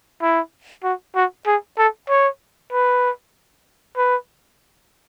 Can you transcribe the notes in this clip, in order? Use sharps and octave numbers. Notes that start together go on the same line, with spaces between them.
E4
F#4
F#4
G#4
A4
C#5
B4
B4